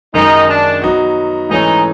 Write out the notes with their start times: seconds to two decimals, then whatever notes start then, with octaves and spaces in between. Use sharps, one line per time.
0.14 F#2 D#3 G#3 D#4
0.48 D4
0.82 F#3 B3 D#4 F#4
1.50 G#2 E3 A3 C#4 D#4